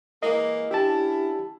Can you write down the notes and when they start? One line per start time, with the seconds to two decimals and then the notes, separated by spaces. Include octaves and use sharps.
0.23 E3 G#3 A#3 D#5
0.71 C#4 D4 E4 G4 A5